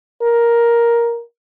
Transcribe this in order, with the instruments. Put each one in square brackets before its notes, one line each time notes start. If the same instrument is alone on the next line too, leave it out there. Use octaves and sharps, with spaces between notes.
[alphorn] A#4